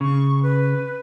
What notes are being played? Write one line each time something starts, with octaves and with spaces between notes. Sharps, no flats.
C#3 C#6
B4